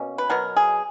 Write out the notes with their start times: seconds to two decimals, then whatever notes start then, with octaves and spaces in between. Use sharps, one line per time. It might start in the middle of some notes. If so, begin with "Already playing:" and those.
Already playing: B2 A#3 C#4
0.18 B4
0.30 B2 F#3 B3 A#4
0.57 G#4